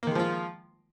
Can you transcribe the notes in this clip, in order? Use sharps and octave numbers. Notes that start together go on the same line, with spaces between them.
D#3 F3 G#3 A#3 F4